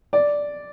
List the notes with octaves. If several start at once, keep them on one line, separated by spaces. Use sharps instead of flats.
D5